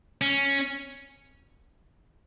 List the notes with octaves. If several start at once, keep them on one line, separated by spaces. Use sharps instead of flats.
C#4